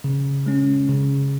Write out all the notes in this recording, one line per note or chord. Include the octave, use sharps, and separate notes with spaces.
C#3
G#3 C#4
C#3